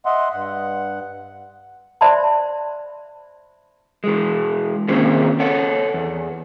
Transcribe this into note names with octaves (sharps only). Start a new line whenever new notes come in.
D#5 E5 F#5 C6
G2 F#5
C5 D5 E5 A5 B5 C6
E3 G#3
D#3 A#3 C4 C#4 G#4
A4 C#5 F#5
E2